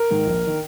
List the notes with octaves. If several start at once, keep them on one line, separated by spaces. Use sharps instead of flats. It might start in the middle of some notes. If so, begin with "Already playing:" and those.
Already playing: A#4
G#2 D#3
A#1
D#3